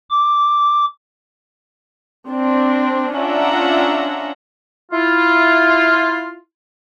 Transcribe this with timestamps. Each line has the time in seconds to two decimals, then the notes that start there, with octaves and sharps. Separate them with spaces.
0.10 D6
2.28 C4 D4
3.17 C#4 D4 F4 E5 F#5 A#5
4.92 E4 F4